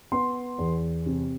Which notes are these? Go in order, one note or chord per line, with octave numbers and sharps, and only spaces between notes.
B3 C6
E2
C3